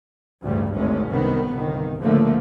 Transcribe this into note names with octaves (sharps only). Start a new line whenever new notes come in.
A1 D2 G2 C#3 G3
G#1 D2 G#3 C#4
C2 D3 D#3 B3
G1 C2 D#3
C#2 A2 D3 F3 A3 A#3